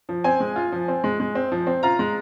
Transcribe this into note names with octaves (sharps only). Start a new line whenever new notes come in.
F3
C4 G#5
G#3
F4
F3
C4
G#3
G#3
C4
F3
C4
F4 A#5
G#3